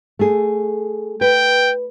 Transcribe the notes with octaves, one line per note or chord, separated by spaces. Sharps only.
A3 G#4
B4 G5